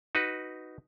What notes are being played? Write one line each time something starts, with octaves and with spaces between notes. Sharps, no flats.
D#4 F#4 B4